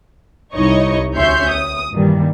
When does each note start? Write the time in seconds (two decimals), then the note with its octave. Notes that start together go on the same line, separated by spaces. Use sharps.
0.54 C2 D#4 E4 C#5 D#5 C#6
1.14 D2 C#4 C#5 E5 C6 G6
1.51 D#6
1.93 G2 A#2 D#3 E3 G3